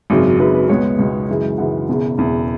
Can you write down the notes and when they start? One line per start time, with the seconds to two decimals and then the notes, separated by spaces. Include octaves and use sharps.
0.10 G#1 F#2 C#3 F#3
0.39 G#1 F#2 C#3 F#3 B4
0.54 B4
0.69 C#2 B2 G#3 B3 C#5
0.99 C#2 B2 G#3 B3
1.28 F#2 C#3 E3 G#3
1.58 F#2 C#3 E3 G#3 F#5
1.88 E1 E2 C#3
2.17 E1 E2 C#3